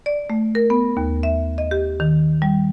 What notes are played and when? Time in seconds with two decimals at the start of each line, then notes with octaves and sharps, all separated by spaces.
0.06 D5
0.30 A3
0.55 A#4
0.70 B3
0.97 D#2
1.23 E5
1.58 D#5
1.71 G4
2.00 D#3
2.42 G3